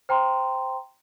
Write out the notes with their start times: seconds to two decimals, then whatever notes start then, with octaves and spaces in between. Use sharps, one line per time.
0.09 C5 G5 A#5 C6